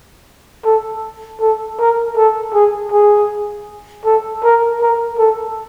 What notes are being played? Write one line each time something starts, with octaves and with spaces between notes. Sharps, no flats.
A4
A4
A#4
A4
G#4
G#4
A4
A#4
A#4
A4